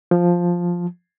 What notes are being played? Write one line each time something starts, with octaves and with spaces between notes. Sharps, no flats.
F3